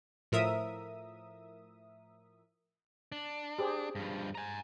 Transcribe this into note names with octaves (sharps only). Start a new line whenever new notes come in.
A2 F3 A#4 E5 D#6
D4
G4 G#4 C5
G2 F3
G#5 A#5